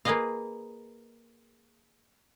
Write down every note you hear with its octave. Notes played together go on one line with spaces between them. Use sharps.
A#3 F4 G#4 B4 D#5 F5